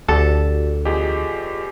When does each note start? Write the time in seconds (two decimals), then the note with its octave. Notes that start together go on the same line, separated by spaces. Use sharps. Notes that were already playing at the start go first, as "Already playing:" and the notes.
0.08 D2 F#4 G4 A4 D5
0.85 E2 F4 G4 G#4 D#5